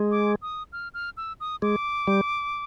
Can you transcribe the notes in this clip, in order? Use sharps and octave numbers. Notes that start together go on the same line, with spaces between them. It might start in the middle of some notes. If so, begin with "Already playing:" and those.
Already playing: G#3
D6
D#6
F6
F6
E6
D#6
G#3 D6
G3